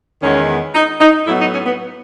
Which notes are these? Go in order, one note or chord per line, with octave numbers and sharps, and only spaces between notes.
E2 D#3 G#3 B3 C#4
D#4
D#4
A2 F#3 B3 E4
D#4
C#4
B3